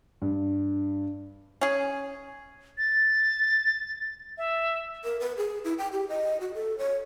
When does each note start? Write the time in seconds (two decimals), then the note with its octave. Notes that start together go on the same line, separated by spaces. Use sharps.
0.22 G2
1.61 C#4 G#4
2.78 A6
4.38 E5
5.04 A#4
5.20 B4
5.37 G#4
5.64 E4
5.78 G5
5.92 G4
6.09 D#5
6.41 F#4
6.55 A4
6.78 C#5